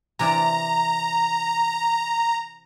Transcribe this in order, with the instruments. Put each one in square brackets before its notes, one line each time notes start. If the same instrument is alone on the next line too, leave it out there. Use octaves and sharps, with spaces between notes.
[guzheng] C3 E3 D5 [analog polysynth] A#5